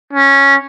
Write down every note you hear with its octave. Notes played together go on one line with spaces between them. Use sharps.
C#4